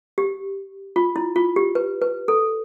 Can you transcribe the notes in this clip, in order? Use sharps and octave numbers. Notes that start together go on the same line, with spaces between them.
G4
F4
E4
F4
G4
B4
B4
A4